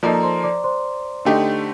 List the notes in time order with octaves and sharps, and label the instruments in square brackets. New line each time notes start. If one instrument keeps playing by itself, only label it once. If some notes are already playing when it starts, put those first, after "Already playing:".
[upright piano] F3 A#3 D#4 A4 [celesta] D5
[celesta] A#5
C5 C6
D5 D6
C5 C6
[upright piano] D3 A3 D#4 G4